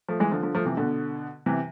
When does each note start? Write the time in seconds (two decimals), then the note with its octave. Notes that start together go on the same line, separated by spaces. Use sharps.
0.09 F3 A3
0.20 E3 G#3
0.32 D3 F3
0.43 D3 F3
0.55 F3 A3
0.65 C3 E3
0.77 B2 D3
1.46 C3 E3